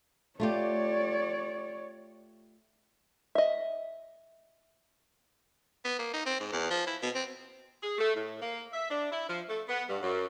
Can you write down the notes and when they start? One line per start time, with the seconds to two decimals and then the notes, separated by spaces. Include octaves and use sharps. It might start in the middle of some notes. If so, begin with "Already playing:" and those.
0.40 A3 F4 G4 C#5 D5
3.35 D#5 E5
5.85 B3
5.99 A#3
6.13 D#4
6.26 C4
6.40 G#2
6.52 E2
6.70 F3
6.87 E4
7.02 B2
7.15 C4
7.82 G#4
7.98 A3
8.15 A2
8.41 A#3
8.72 E5
8.90 D4
9.12 E4
9.28 F3
9.49 A3
9.68 B3
9.89 G2
10.02 F#2